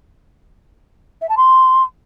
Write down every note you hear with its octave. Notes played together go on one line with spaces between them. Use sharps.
E5
A5
C6